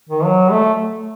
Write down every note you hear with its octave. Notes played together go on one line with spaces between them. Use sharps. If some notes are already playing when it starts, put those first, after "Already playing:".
D#3
F#3
A3